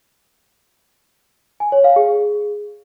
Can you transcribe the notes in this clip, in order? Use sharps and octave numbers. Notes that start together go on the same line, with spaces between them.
G#5
C#5
F5
G#4